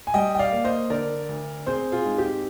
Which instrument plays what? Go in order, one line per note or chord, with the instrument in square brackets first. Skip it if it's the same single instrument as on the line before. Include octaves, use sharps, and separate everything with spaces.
[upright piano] G#5
G3 D#5 G5
G5
D5 F5
A#3
C5 D#5
D3 A#4 D5
D2
C4 G#4 C5
F4 G#4
G#2
G4